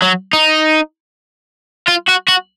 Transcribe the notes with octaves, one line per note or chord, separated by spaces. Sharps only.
F#3
D#4
F4
F#4
F#4